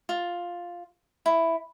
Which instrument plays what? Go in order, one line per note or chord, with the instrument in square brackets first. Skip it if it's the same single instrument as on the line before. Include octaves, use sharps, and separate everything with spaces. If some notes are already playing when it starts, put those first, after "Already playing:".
[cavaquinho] F4
E4